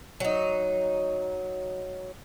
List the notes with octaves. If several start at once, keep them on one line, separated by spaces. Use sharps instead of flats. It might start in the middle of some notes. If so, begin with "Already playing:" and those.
F#3 D#4